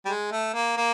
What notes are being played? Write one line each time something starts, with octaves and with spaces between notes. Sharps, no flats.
G3
G#3
A3
A#3
A#3